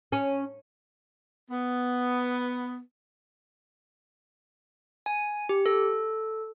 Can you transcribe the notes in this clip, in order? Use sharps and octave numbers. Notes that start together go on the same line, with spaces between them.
C#4
B3
G#5
G4
A4